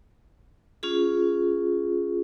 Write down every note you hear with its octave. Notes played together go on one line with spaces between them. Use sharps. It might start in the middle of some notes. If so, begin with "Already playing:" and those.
C#4 F4 G#4